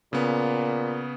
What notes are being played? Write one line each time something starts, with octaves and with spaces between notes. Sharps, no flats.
A#2 C#3 B3